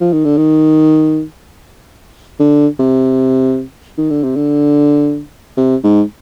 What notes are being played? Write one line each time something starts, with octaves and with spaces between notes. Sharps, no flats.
F3
D#3
D3
D#3
D3
C3
D#3
D3
C3
D3
C3
G#2